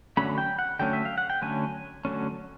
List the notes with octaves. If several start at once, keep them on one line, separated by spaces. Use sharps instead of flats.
D3 F#3 A3 C#4 B5
G5
F#5
D3 F#3 A3 C#4 G5
E5
F5
F#5
G5
D3 F#3 A3 C#4 G#5
D3 F#3 A3 C#4